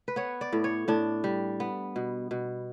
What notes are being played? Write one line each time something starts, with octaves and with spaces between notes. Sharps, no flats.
B4
B3 C#5
D5
A2
C#5
A2 D4
G3
B3
B2
B2